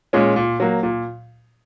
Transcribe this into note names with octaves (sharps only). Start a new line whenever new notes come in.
A#2 G#3 C#4
A#2
F#3 A#3
A#2